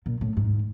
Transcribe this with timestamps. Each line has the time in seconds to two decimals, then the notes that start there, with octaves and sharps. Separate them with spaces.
0.06 A#2
0.21 A2
0.37 G#2